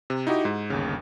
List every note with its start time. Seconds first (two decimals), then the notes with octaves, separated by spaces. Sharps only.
0.10 C3
0.27 D#4 E4 F#4 G4 D#5
0.45 G#2
0.70 G1 D#2 C#3